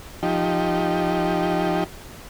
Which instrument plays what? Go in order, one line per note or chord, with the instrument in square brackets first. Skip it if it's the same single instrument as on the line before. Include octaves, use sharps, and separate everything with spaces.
[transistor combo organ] F3 D#4 G4